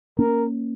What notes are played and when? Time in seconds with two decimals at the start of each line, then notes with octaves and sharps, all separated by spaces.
0.19 A#3 C#4 A#4